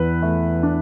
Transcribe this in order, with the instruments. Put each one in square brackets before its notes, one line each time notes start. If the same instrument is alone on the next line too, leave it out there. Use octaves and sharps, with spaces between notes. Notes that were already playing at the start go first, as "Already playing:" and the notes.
Already playing: [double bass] E2 [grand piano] B4
[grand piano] A3
D4